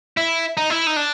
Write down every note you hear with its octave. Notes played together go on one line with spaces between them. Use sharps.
E4
D#4
E4
D#4
D4